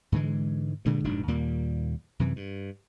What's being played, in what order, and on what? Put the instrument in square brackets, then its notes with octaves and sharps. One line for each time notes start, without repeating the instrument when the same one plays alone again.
[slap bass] G#2 D3 E3 G#3
G2 A#2 D3 G#3
F1 G#2 B2 D4
D#2 A#2 G3 A#3
F#2 C3 E3
G2